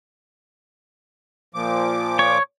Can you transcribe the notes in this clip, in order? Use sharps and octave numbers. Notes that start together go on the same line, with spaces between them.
A#2 F3 D6
C#5